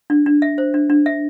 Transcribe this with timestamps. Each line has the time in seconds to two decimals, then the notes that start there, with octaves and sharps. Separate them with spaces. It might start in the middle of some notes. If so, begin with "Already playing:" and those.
0.10 D4
0.26 D4
0.42 E5
0.58 C5
0.74 D4
0.90 D4
1.06 E5